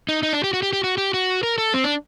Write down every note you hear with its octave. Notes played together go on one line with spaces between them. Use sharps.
D#4
D#4
D4
G4
F#4
G4
G4
F#4
G4
F#4
A#4
A4
C4
D4